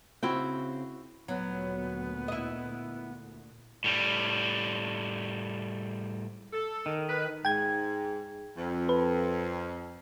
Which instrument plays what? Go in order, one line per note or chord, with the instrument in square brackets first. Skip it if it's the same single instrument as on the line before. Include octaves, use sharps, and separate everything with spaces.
[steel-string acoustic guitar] C#3 C4 [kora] E4 F#4 G5
[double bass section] D2 A#2 [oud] F#3 [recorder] B3
[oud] E4 D#5
[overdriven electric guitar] A2 G3
[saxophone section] A4
[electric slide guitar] D#3
[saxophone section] B4
[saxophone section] G#2 [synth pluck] G5 G#6
[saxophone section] F2
[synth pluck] B4